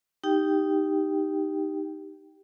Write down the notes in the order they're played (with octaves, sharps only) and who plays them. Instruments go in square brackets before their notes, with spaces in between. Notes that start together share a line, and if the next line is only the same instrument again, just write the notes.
[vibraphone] D#4 G4 G5